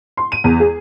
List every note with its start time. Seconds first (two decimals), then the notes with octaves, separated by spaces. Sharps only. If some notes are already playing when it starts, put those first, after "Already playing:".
0.17 C6
0.32 D#7
0.44 E2
0.60 G#4